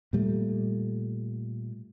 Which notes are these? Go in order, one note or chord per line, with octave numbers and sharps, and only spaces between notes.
A#2 G3 A3